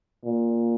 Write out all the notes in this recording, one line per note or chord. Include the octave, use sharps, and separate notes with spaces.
A#2